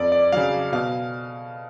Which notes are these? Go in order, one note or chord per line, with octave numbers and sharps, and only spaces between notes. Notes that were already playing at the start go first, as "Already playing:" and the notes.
Already playing: F2 D5
D5
C#3 F#3 F5
B2 F5